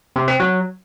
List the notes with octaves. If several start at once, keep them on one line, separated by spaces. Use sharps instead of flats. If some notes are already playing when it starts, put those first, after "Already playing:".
C3
C4
F#3